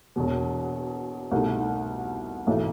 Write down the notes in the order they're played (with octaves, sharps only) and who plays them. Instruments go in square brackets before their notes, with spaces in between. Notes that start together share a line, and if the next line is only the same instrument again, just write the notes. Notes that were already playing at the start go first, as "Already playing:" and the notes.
[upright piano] E1 E2 B2
C2 B2 A3 D#4
B1 A2 E3 A3